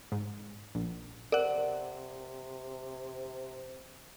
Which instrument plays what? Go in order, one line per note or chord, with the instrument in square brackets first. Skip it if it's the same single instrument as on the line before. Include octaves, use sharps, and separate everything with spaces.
[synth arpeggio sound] G#2
A#1
[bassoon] C3 [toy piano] A#4 [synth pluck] D5 F#5